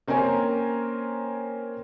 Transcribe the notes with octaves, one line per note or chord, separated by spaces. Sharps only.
A#3 C4 C#4 A#4 G#5